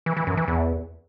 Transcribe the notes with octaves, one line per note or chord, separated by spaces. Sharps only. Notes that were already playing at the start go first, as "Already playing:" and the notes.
E3
E3
F#2
E3
E2